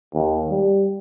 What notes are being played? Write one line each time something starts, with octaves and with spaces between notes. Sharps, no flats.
D#2
G3